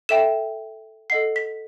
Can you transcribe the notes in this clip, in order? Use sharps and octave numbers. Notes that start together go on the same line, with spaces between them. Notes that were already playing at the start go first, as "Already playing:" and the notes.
A4 E5 G5 E7
A4 D#5 F#5 C7
B6